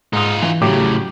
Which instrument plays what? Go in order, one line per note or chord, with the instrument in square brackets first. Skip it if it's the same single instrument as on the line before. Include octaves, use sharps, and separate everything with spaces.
[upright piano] G#2 D#6 [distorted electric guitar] D#4 F4
[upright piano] E3
[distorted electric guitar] A2 C#3 [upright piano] F#3 G4 D6